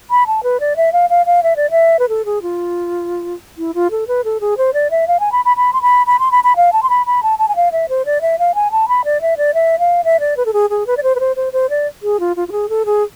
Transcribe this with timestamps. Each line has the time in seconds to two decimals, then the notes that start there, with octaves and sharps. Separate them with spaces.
0.10 B5
0.27 A5
0.43 B4
0.60 D5
0.76 E5
0.93 F5
1.10 F5
1.26 F5
1.43 E5
1.56 D5
1.71 E5
1.99 B4
2.09 A4
2.25 G#4
2.42 F4
3.58 E4
3.75 F4
3.91 A4
4.08 B4
4.24 A4
4.41 G#4
4.57 C5
4.74 D5
4.91 E5
5.08 F5
5.20 G#5
5.32 B5
5.45 B5
5.57 B5
5.73 C6
5.82 B5
6.06 B5
6.19 C6
6.31 B5
6.44 B5
6.56 F5
6.73 A5
6.83 C6
6.89 B5
7.06 B5
7.23 A5
7.39 A5
7.48 G#5
7.56 F5
7.72 E5
7.89 C5
8.06 D5
8.21 E5
8.39 F5
8.55 G#5
8.71 A5
8.88 B5
9.05 D5
9.21 E5
9.37 D5
9.54 E5
9.79 F5
10.04 E5
10.20 D5
10.37 B4
10.46 A4
10.53 G#4
10.70 G#4
10.87 B4
10.97 D5
11.03 C5
11.15 B4
11.20 C5
11.36 C5
11.53 C5
11.70 D5
12.03 G#4
12.20 F4
12.36 F4
12.48 F4
12.52 G#4
12.69 A4
12.85 G#4